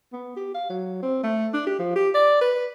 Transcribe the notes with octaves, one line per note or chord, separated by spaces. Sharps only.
B3
G4
F5
F#3
C4
A3
D4
G4
F3
G4
D5
B4